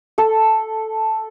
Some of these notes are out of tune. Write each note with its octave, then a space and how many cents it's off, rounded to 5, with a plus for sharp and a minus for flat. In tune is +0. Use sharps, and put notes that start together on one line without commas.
A4 +0